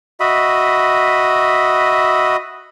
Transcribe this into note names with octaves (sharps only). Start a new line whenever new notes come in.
F#4 D#5 E5 B5